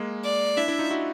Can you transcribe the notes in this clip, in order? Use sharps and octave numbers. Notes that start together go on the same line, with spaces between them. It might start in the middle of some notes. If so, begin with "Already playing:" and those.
Already playing: G#3 A#3
D5
D4 E4 E5
D4 E4
D#4 F4
E4 F#4